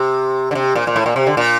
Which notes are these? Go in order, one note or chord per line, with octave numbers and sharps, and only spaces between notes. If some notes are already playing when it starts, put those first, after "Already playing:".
Already playing: C3
D3
C3
A#2
A#2
A2
A#2
C3
D3
A#2